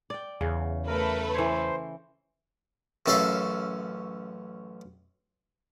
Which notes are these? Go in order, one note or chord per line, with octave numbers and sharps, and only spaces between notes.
D5 G5
E2 C#3
A3 A#4 B4
E3 C5 C#5
A1 F#2 C#4 A4 E5 F5